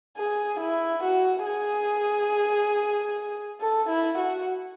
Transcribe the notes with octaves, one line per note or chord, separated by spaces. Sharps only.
G#4
E4
F#4
G#4
A4
E4
F#4